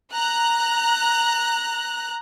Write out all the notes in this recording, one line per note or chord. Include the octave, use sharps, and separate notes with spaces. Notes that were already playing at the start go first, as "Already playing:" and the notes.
A#5 F#6